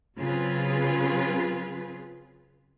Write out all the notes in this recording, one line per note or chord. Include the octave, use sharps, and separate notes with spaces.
C#3 F#3 C4 F4 G#4 B4